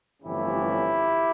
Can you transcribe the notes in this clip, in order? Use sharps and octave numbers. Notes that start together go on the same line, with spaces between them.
G1 F2 E3 A3 C#4 E4 G4